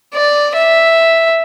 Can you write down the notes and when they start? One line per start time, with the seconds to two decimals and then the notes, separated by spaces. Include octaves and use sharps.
0.14 D5
0.55 E5